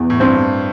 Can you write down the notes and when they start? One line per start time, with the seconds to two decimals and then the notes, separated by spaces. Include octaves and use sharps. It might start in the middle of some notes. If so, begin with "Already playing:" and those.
Already playing: E2 B2
0.10 A2
0.20 G2 C4